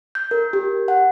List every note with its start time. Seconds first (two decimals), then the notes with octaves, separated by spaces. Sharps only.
0.15 G6
0.31 A#4
0.53 G4
0.88 F#5